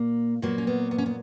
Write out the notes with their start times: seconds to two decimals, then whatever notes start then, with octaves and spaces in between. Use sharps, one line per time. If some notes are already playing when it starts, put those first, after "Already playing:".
Already playing: A#2 A#3
0.42 A#2 F#3 A#3 B3
0.58 C#4
0.67 B3
0.91 B3
0.98 C#4
1.06 B3